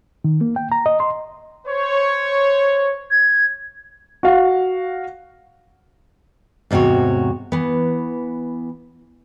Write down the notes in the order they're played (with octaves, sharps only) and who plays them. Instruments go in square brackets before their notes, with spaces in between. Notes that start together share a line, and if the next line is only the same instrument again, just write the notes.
[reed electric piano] D#3
A#3
G5
A#5
D#5
C6
[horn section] C5 C#5
[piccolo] G#6
[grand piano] F#4 F5 F#5
[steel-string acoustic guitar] E2 G#2 C3 F#4 C#5
E3 B3